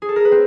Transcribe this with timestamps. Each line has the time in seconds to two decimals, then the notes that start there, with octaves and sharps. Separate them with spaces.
0.02 G#4
0.09 A4
0.16 A#4
0.25 B4
0.32 C4